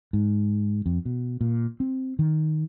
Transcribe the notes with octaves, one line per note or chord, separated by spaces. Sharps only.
G#2
F2
B2
A#2
C4
D#3